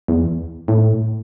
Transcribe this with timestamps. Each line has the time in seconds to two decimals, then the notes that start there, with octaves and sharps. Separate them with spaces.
0.08 E2
0.68 A2